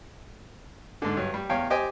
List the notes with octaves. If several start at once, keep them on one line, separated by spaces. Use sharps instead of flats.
G#2 D3
G2 F#3
G3
E2 C#5 F5 G5
G4 C5 D#5 G5 G#5